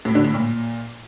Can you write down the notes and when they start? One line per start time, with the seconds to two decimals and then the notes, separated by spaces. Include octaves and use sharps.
0.05 A2
0.15 D3
0.25 A2
0.34 A#2